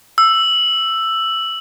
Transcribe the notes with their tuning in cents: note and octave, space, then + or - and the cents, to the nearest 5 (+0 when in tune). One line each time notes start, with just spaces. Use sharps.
E6 +5